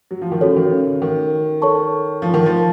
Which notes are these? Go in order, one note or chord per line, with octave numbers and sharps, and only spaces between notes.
F#3
F3
D#3
C#3 F#4 A4 C#5
D#3
C#3
C#3
D#3
A4 C#5 A5 C#6
F3
D#3
F3